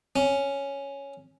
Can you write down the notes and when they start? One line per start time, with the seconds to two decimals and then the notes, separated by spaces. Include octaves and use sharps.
0.16 C#4